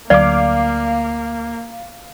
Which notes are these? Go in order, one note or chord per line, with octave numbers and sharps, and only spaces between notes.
D2 F#3 A#3 D5 F5 D6